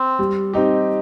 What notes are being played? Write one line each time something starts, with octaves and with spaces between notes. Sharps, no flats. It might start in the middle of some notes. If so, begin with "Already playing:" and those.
Already playing: C4
G3
C4 D#4 G4